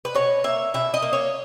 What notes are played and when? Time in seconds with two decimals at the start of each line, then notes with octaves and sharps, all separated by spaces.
0.05 B4
0.15 B2 C#5
0.44 A#3 E5
0.74 B2 E5
0.94 D#5
1.02 A#3
1.13 C#5